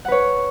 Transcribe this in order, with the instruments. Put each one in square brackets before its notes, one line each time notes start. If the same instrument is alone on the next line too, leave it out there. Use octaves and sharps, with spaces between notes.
[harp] F#5
B4
C#5